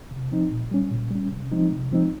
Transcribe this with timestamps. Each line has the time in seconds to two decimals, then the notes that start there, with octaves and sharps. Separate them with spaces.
0.11 C3
0.31 F3 C4 D#4
0.51 A#2
0.71 G3 C#4
0.91 A#2
1.11 G3 C#4
1.31 C3
1.52 F3 G#3 C4 D#4
1.71 C3
1.92 F3 G#3 C4 D#4